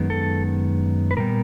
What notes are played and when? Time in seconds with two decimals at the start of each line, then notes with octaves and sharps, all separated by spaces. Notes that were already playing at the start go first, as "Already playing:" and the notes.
Already playing: F#2 D#3 G#3 B3
0.10 A4
1.11 B4
1.17 A#2 G3 B3 A#4